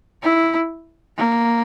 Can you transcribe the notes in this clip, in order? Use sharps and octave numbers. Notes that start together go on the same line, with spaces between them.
E4
A#3